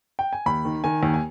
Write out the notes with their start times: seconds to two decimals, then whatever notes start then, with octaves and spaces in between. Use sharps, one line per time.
0.19 G5
0.33 G#5
0.46 D#2 B5
0.65 D#3
0.84 D#3 G#5
1.03 D#2
1.14 G#5